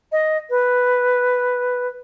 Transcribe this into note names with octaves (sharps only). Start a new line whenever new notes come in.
D#5
B4